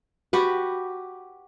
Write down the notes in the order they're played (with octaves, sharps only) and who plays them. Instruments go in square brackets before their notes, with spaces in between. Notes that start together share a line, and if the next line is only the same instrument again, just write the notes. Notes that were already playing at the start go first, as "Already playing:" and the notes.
[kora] F#4 G4 B4